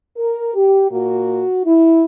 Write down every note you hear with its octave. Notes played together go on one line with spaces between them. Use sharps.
A#4
G4
A#2 A#3 F#4
E4